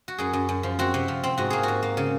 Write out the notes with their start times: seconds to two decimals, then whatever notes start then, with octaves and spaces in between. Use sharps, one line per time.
0.08 F#4
0.18 F#2 G#4
0.33 F#2
0.49 F#2
0.63 F3
0.79 C4 F#4
0.94 C3
1.08 F3
1.23 C4
1.37 G#2 F#4
1.50 A#3 G#4
1.63 G#2 F#4
1.82 A#3
1.97 C#3